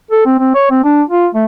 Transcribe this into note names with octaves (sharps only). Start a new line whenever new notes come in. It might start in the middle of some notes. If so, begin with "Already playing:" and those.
A4
C4
C4
C#5
C4
D4
F4
A3